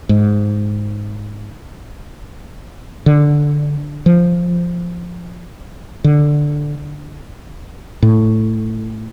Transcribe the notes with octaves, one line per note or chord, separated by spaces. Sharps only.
G#2
D3
F3
D3
A2